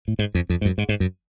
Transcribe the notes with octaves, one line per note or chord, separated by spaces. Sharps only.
A2
G#2
F2
F2
G#2
F#2
G#2
G#2
F#2